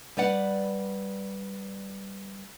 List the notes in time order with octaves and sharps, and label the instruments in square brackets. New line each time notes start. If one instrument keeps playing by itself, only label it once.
[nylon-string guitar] G3 B4 D5 F#5